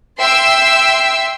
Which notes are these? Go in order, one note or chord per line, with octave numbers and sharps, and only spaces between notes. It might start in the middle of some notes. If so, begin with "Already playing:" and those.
E5 G5 C6 E6